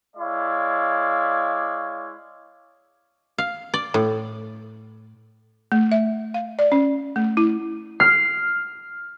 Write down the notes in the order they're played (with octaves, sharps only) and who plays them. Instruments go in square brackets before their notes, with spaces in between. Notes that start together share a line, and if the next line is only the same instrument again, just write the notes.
[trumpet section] G#3 E4 C#5 D5 F5
[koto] F5
D5
A2
[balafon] A3
E5
F5
D5
C#4
A3
E4
[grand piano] F6 [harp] C7